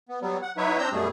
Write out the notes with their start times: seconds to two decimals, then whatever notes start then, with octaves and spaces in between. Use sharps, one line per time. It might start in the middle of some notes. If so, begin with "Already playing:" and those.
0.09 B3
0.22 F#3 G3 B3
0.42 F#5
0.57 F#3 D#4 E4 B4 C#5 E5
0.78 C4 D4 A#5 E6 G6
0.92 F#2 B2 G3 A3 G#4